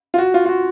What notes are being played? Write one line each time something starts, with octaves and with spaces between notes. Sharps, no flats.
F4
F#4
F4
F4
F#4